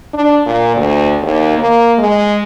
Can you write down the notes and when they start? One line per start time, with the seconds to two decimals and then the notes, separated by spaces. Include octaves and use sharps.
0.14 D4
0.46 A#2
0.76 D2
1.22 D#2
1.58 A#3
1.98 G#3